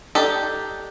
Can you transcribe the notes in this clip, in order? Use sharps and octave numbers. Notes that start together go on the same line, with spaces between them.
D4 D#4 G4 A4